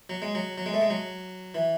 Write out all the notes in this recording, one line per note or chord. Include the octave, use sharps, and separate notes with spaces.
F#3
G#3
F#3
F#3
G#3
A3
G#3
F#3
E3